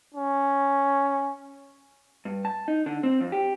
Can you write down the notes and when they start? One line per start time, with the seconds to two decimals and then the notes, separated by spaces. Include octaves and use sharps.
0.14 C#4
2.25 G2
2.45 A5
2.68 D#4
2.86 D3
3.03 C4
3.21 F2
3.32 G4